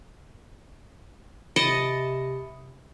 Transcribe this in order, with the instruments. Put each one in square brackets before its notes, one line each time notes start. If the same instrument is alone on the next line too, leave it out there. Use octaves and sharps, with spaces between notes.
[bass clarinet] C3 [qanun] D#5 A5 [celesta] B5 C#7 D7